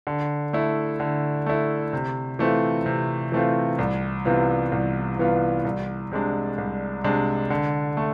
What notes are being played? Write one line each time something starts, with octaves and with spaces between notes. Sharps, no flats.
D3
A3 E4
D3
A3 E4
C3
E3 A3 C4 F4
C3
E3 A3 C4 F4
C2
C3 E3 B3 F4
C2
C3 E3 B3 F4
C2
C3 G#3 D4
C2
C3 G#3 D4
D3
A3